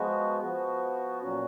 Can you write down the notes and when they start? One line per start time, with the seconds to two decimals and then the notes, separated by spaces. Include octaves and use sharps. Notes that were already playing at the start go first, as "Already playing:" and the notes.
Already playing: F3 G#3 B3 F#4
0.42 F3 B3 F#4
1.23 A#2 F#3 C#4 F#4